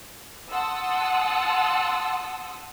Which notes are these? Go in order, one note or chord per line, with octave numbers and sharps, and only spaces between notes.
F#5 A5 C6 D#6 E6